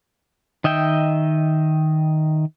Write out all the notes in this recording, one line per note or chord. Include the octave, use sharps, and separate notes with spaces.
D#3 D#5 E5 G5